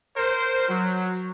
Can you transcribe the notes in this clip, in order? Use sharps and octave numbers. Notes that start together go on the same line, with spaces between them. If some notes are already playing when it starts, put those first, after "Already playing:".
A#4 C5
F#3